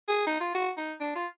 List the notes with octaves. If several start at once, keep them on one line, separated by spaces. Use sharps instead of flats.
G#4
D#4
F4
F#4
D#4
D4
F4